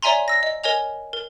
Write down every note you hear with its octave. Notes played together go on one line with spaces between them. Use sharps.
C#5 D5 E5 G#5 A#5 C6
E6 A#6
D#5
A#4 C#5 D#5 G#5 F7
A#4